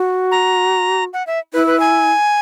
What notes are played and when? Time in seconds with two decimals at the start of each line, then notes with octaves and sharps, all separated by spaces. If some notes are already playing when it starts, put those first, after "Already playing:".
Already playing: F#4
0.31 A#5
1.13 F#5
1.27 E5
1.54 E4 B4
1.67 B4
1.80 G#5